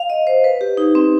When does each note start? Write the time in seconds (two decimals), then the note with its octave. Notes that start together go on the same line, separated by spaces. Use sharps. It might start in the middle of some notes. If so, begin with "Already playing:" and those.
Already playing: F5
0.10 D#5
0.27 C5
0.44 B4
0.61 G4
0.77 D#4
0.95 C4